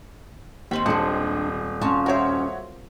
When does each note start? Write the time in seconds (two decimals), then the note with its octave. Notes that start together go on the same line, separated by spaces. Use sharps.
0.71 D#2 G#3 C4 B5 F#7
0.86 D#1 D4 G#4 F#5 A5
1.81 C#4 F4 F#4 A5
2.06 F#4 A#4 C5 C#5 E5